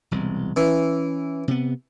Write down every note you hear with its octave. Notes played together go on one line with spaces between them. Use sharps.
E1 C2
E3 C#4
C3 B3